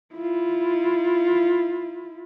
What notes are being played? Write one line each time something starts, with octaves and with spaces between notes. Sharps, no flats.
E4 F4